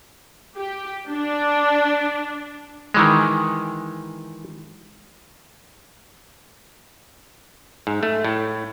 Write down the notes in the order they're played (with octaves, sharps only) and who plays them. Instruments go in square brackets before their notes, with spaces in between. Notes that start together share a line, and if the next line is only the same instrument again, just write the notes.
[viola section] G4
D4
[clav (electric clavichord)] D#3 E3 G#3
G#2
A3
A2